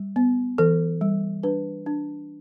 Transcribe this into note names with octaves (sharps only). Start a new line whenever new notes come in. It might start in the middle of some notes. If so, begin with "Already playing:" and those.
Already playing: G3
B3
E3 A4
G3
D4 B4
D4